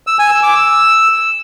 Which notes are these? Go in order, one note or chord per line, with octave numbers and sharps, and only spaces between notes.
E6
G#5
E6
D6
E6